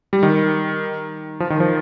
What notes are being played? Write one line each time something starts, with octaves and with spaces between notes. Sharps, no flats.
G3
D#3
F3
D#3
F3